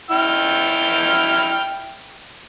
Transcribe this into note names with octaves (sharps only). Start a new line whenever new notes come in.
E4 G5 F6